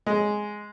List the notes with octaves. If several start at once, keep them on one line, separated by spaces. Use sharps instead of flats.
G#3